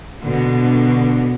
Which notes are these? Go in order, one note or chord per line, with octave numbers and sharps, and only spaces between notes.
B2 D3